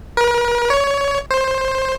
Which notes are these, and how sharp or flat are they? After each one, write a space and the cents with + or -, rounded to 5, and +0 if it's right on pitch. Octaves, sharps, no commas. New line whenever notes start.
A#4 +45
C#5 +20
C5 +15